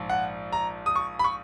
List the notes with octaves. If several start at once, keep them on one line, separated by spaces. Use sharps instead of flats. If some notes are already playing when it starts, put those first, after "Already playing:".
Already playing: A#1 G#2 F3
F#5
A#5
D#6
C#6
B5
C#6